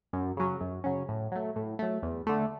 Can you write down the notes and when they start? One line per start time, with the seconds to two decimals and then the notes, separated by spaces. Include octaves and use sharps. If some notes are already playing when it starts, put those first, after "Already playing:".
0.13 F#2
0.37 C#3 F#3 C#4
0.61 F#2
0.84 C#3 F#3 C#4
1.09 A2
1.32 F#3 A3
1.56 A2
1.79 F#3 A3
2.03 E2
2.27 D3 A3